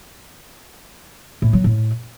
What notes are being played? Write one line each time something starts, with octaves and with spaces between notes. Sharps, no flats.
A2
F#3
A2